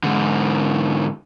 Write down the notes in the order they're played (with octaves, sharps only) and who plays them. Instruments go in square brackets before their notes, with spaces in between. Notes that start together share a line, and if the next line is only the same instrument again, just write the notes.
[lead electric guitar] G#2 D3